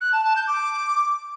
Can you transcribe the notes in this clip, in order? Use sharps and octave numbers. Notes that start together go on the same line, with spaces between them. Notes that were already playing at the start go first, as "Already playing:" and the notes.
F#6
A5
A5
G6
D6